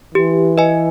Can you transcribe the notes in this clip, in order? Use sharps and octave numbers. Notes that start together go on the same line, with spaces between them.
E3 G4
B4 D#5 G#5